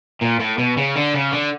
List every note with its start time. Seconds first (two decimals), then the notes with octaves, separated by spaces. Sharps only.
0.21 A#2
0.40 A2
0.58 B2
0.77 C#3
0.96 D3
1.14 C#3
1.32 D3